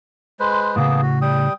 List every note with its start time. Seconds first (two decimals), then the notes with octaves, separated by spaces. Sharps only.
0.40 G#3 B4 C5
0.76 A2 C#3 A#3 B3 G#4
1.02 F#4
1.22 G3 G5 D#6